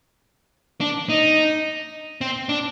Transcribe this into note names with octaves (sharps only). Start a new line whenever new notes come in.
D4
D#4
C4
D4